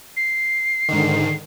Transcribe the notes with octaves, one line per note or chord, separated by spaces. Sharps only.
C7
G#2 D3 D#3